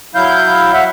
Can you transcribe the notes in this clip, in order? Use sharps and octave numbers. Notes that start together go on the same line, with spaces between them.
F#3 E4 F5 G6
E5 F#5